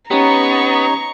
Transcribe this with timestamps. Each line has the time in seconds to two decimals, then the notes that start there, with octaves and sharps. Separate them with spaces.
0.11 B3 C#4 D#4 G4 C#5 A#5 C#6